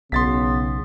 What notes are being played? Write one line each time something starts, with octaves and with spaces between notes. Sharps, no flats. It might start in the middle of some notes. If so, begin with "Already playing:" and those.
B1 C#3 B3 C6 A6 B6